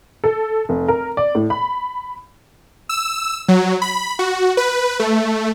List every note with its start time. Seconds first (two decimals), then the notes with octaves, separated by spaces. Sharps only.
0.24 A4
0.69 F1
0.88 A#4
1.17 D5
1.35 A2
1.50 B5
2.89 E6
3.48 F#3
3.82 B5
4.19 F#4
4.57 B4
5.00 A3